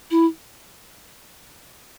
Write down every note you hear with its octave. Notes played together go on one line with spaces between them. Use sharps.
E4